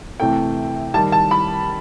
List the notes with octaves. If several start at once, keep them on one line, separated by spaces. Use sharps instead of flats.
C3 E3 A3 G5
D#3 G3 A5
A5
B5